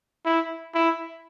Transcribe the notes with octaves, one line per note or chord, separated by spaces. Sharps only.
E4
E4